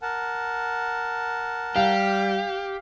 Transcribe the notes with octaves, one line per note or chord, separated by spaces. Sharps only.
A#4 F#5 A5
G3 G4 F5